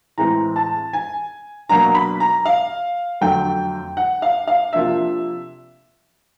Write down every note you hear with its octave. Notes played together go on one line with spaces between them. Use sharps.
A2 E3 G#3 C4 A#5
A5
G#5
B2 F#3 A#3 D4 A#5
B5
A#5
F5
F2 D3 F#3 A3 G5
F#5
F5
F5
C3 F3 A#3 D4 E5